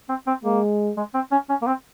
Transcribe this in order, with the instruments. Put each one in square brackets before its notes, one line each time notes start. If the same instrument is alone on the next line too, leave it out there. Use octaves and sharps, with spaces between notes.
[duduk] C4
C4
[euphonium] G#3 [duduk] A#3
[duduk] G#3
C4
C#4
C#4
A#3
C4